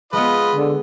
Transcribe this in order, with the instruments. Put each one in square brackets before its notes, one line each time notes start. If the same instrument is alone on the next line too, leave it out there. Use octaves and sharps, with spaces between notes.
[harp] G#3 B3 [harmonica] F4 B4 D#5
[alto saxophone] D3